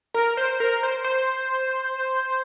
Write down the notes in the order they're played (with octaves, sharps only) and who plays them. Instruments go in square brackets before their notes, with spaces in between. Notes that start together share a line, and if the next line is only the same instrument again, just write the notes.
[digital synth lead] A#4
C5
A#4
C5
C5